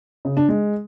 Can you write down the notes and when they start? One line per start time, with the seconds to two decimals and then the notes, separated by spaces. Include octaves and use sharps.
0.25 C#3
0.37 D4
0.49 G#3